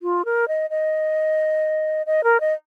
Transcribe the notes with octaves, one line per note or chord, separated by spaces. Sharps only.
F4
A#4
D#5
D#5
D#5
A#4
D#5